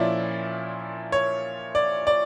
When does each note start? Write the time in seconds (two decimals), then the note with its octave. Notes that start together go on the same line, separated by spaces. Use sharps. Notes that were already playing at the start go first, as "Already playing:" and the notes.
Already playing: A#2 F3 C#4 E4 D5
1.12 C#5
1.75 D5
2.07 D5